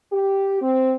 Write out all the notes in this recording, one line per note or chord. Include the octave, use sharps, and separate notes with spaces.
G4
C4